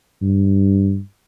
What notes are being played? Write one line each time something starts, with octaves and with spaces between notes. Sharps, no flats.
G2